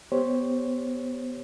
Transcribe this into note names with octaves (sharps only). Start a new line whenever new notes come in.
B3 G4 C5 C#5